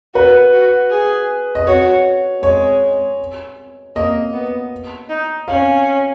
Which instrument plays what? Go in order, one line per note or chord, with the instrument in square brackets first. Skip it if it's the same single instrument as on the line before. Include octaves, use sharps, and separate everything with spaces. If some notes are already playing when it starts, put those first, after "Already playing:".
[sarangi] F#4 [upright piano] B4
[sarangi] F#4
G#4
[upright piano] D#5
[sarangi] F#4 [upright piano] C#5
[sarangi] G#3 [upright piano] C#5
[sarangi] A#3 [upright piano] D#5
[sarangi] B3
D#4
[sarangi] C#4 [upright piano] F5